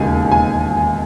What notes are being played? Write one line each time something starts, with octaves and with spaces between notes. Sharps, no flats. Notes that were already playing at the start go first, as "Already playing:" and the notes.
Already playing: E1 D#2 C#3 G#5
G#5